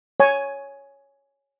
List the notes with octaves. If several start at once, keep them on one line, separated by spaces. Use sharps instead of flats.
C#5 G#5